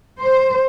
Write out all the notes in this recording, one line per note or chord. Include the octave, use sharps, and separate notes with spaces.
C5